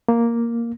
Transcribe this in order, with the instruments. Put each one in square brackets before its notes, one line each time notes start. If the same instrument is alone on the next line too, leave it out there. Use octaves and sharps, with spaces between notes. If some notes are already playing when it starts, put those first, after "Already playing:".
[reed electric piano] A#3